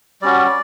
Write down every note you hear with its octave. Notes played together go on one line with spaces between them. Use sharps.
G3 C#4 F#4 D5